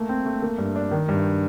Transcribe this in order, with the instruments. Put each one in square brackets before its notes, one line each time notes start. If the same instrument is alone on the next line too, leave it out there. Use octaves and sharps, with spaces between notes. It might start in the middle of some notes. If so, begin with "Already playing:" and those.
Already playing: [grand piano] A3 A#3
C4
A3
A#3
G2
D4
D#3
G2